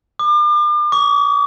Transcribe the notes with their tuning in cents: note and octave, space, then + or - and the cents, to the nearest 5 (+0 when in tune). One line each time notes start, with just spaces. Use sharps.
D6 +40
D6 -45